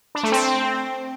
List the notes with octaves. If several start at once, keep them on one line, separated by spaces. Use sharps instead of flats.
D4
A3
C4